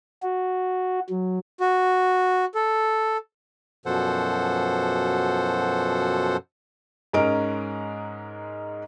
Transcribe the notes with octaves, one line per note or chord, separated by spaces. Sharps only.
F#4
F#3
F#4
A4
F#2 B2 F3 A4 C5 F#5
G#2 G#3 C#4 A#4 D7